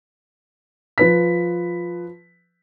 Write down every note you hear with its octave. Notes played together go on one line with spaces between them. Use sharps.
F3 B4 B6